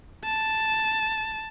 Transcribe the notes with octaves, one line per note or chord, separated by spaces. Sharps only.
A5